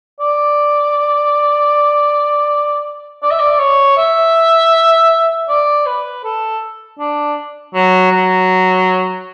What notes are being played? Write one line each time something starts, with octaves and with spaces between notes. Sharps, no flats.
D5
D5
E5
D5
C#5
E5
D5
B4
A4
D4
F#3
F#3